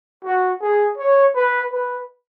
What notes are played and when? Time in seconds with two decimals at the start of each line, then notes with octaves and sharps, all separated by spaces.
0.24 F#4
0.61 G#4
0.98 C#5
1.35 B4
1.72 B4